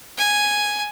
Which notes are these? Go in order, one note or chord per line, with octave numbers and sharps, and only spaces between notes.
G#5